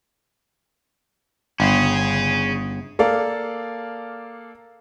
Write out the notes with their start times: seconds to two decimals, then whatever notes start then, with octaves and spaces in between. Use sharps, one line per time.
1.60 G1 C#4 G#4
2.99 A#3 A4 D5 F5